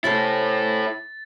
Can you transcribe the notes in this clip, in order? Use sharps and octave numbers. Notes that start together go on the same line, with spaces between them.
C3 C#4 E4 A4 C5 A6